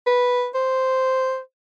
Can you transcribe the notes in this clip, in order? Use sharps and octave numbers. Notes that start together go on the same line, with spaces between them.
B4
C5